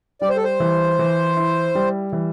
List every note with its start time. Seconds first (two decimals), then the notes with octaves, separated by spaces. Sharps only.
0.21 G3 D5
0.29 C5
0.36 A4
0.44 C5
0.60 E3
0.99 E3
1.37 E4
1.75 G3
2.13 E3